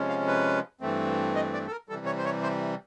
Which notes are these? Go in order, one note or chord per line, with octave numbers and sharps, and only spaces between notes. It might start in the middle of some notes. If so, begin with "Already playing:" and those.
Already playing: C3 F3 G#3 C#4
F5
B4
G2 E3 A3 C4
D#5
D5
A4
A#4
C3 E3 G3 A4
C#5
C5
C#5
C5